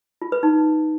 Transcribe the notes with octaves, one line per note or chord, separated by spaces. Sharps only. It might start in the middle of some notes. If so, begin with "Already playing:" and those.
F4
B4
D#4